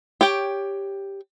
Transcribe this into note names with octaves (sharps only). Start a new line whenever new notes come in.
G4 C#5 G5